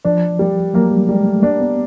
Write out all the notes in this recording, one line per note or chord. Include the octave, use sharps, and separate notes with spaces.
F3 D4
G3
F#3 A#3
G3
G3 G#3
A3
A#3 D4
B3